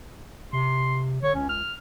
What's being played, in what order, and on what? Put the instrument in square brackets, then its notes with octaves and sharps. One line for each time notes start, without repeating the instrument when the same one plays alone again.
[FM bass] C3 [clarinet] C6
[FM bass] D3 [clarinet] C#5
[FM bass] C#2 [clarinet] C#4
[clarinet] F6